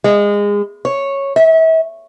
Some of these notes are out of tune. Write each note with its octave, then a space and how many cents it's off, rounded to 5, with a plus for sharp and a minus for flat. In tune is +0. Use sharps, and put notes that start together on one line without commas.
G#3 -25
C#5 -5
E5 -35